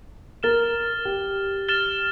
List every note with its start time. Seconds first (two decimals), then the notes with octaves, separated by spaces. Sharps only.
0.43 A#4 F6 A6 E7 G7
1.05 G4
1.68 F6 A6 E7 G7